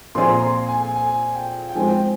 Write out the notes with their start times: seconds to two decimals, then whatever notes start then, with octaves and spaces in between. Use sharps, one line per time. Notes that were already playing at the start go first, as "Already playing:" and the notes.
0.15 A#2 F3 C4 F4 G#4 C6
0.29 A#5
0.42 C6
0.68 G#5
0.82 G#5
0.96 G#5
1.35 G5
1.69 G5
1.75 F3 G#3 C4 G#5
1.88 G5